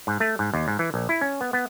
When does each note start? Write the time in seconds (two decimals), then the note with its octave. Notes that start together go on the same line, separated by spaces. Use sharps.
0.07 G#2
0.20 A3
0.39 G#2
0.54 D#2
0.68 G#2
0.79 E3
0.94 A#1
1.09 E4
1.21 C#4
1.41 B3
1.53 B3